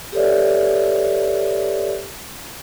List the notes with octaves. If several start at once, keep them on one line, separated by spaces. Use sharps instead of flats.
G4 A4 B4 C#5 D5 E5